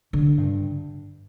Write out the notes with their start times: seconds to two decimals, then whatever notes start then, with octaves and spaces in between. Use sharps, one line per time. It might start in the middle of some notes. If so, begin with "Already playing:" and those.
0.13 D3
0.38 G2